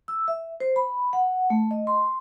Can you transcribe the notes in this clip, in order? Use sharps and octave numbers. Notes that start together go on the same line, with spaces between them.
E6
E5
C5
B5
F#5
A3
D#5
C6